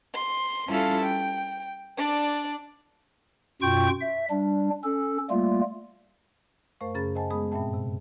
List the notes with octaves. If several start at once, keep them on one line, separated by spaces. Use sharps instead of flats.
C6
G3 C#4 E4 F4 A4 F5
G5
D4 D5
F#2 B2 F4 G5 C#6 G6
E5
G3 D4
C#4 A4
G3 A3 A#3 F4
F#2 A3 A#4 C5 F5 C#6
F#2 C#3 C#4 G#4 B5 A6
C5 D#5 F#5 G#5 A5
G#3 B3 G#4 B5 D#6
G2 A#2 C4 E5 G5 A5
C3